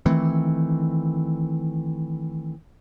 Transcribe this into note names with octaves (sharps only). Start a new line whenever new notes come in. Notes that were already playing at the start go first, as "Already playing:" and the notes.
D#3 E3 A3 C4